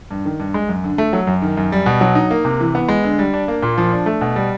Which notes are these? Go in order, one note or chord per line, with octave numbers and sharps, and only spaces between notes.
G2
D#3
G2
G#3
F#2
D3
A3
F#3
F#2
D#3
F#2
G3
B2
F#3
D#4
A#3
C3
E3
B3
G#3
D3
G3
D4
A#3
A#2
F3
D4
A3
B2
G3